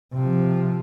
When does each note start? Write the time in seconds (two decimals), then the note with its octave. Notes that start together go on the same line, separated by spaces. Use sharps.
0.13 C3 F3